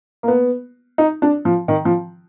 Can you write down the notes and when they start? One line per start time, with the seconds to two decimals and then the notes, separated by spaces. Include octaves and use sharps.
0.23 A#3
0.28 B3
0.98 D#4
1.22 D4
1.45 F3
1.68 D#3
1.85 F3